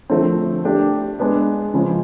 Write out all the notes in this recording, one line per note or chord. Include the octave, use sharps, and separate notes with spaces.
D3 F3 A3 C4
A3 D4 G4
G#3 B3 D4
C#3 F3 G#3 C4